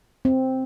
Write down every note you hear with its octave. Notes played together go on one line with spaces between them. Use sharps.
C4